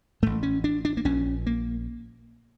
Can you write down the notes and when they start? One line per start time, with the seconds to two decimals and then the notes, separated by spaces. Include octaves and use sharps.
0.22 A1 A2 A3
0.43 C#4
0.64 D4
0.85 D4
0.97 A#3
1.05 A#1 A#2 C#4
1.47 A#3